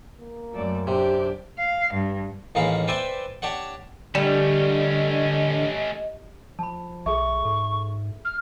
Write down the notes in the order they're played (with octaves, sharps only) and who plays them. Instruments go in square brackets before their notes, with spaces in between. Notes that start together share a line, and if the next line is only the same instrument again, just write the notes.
[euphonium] A#3
[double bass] F#2 [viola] A3 D5
[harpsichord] C3 [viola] D4 G4
[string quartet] F5
G2
[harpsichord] A1 D#2 G#3 A#3 F5 B5
B4 C5 D5 E5 G5 G#5
D4 G4 C#5 F#5
[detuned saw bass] D3 [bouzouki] G3 [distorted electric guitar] A3 C#4 [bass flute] D#5
[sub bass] F3 [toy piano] A5 B5
[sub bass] B1 [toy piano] G#4 A4 E5 [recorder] C#6
[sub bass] G#2 [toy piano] A4
[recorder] F6